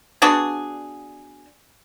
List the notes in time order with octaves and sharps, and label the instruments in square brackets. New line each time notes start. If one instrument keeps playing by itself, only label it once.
[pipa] B3 D4 F#4 G#4